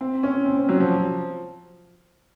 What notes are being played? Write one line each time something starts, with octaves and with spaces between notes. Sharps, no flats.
C4
C#4
C4
C4
F#3
F3